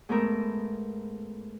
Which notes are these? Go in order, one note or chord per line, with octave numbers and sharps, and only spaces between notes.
G#2 A3 B3 A#4 E5